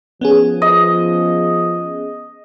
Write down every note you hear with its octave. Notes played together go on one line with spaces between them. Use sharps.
F3 B3 C#4 G#4
D#5